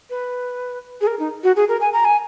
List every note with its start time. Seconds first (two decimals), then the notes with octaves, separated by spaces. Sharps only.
0.10 B4
1.01 G#4
1.07 A#4
1.19 D#4
1.44 F#4
1.56 G#4
1.69 A#4
1.81 G#5
1.93 A#5
2.05 G#5